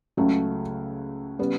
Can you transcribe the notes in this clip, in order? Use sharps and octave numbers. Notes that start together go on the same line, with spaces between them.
C#2 C#3 F#3 A3
C#3 G3 B3